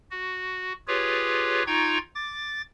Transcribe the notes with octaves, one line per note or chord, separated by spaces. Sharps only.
F#4
F4 G4 G#4 B4 C#5
D#4 F4 G5 A#5 C#6 G#6
D6 A6